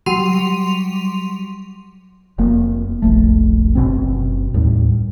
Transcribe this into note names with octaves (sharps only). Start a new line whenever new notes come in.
F#3 G3 C6 D#7 F7
F1 A#3
E1 A#1 A3
F#1 B2 C4
D#2 A2 G3